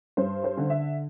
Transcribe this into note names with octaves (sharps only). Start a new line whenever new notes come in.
G2 C5
C5
D3
E5